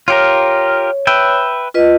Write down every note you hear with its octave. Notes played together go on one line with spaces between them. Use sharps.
F4 G4 A#4 C#5
B4 E5 G5
F4 B4 D#5